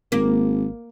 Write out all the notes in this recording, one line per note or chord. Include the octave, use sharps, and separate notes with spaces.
G#1 A#3